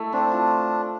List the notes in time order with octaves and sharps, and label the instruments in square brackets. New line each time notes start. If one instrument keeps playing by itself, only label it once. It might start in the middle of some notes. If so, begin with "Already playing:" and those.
Already playing: [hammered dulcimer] A3 E4
[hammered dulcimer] C4 [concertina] D4
[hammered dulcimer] F4